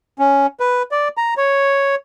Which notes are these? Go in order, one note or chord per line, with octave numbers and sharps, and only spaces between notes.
C#4
B4
D5
A#5
C#5